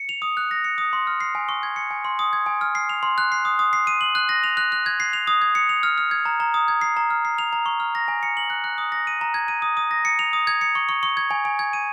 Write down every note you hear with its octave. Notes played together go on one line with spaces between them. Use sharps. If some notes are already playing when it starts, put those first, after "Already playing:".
Already playing: C#7
F7
D#6
F#6
A#6
C#7
D#6
C6
F6
C7
G#5
C#6
G#6
C#7
G#5
C6
D#6
G#6
G#5
F6
C7
F7
C6
F#6
C7
D#6
D#6
C7
D#7
F#7
F#6
A#6
F7
F#6
F#6
G#6
C7
F7
D#6
G#6
C#7
F7
F6
F6
G#6
A#5
A#5
D#6
G#6
C7
A#5
F6
C7
F7
A#5
C#6
F6
A#6
G#5
C#7
F#7
F#6
F#6
D#6
A#6
D#7
A#5
G#6
D#7
D#6
D#6
A#6
C#7
F7
D#6
G#6
C#7
C#6
C#6
C#6
G#6
G#5
G#5
G#6
D#7